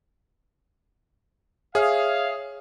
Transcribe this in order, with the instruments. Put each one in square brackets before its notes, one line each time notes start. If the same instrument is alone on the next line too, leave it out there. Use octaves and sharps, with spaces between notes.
[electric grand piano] G#4 [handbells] C#5 E5 D#6 [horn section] F5